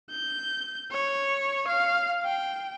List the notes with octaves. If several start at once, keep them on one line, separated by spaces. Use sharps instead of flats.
G6
C#5
F5
G5